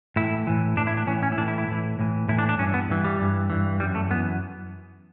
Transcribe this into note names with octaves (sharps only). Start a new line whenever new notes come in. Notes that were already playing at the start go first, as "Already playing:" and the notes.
A2 E3 E4
A2 E3
A2 E3 D4
E4
D4
A2 E3 C#4
C#4
E4
A2 E3 D4
E4
E4
A2 E3
A2 E3
A2 E3 E4
D4
D4
G2 E3 C#4
B3
G2 E3
G3
G2 E3
G2 E3
F#2 E3 G3
A3
F#2 E3 B3